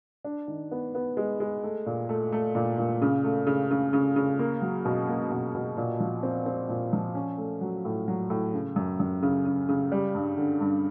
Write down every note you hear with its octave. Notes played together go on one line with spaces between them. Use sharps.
D4
D#3
B3
B3
G#3
G#3
A3
A#2
A3
A3
A#2
A#2
C#3
A3
C#3
C#3
C#3
C#3
A#3
F#3
B2
A#3
B2
B2
A#2
F3
C4
C4
A#2
F3
C#4
A3
F#3
A2
F#3
A2
C#3
F#2
F#2
C#3
C#3
C#3
G3
G2
D3
G2